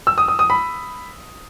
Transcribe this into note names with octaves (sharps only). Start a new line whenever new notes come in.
E6
D#6
D#6
D#6
B5